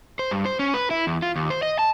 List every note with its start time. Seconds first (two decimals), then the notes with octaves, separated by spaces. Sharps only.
0.19 C5
0.31 G2
0.45 C5
0.59 C#4
0.74 B4
0.91 E4
1.07 E2
1.22 F4
1.36 D#2
1.50 C5
1.62 D#5
1.79 A5